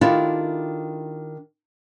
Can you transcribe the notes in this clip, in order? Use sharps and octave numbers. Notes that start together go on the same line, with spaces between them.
D#3 D4 E4 F4 G4 A4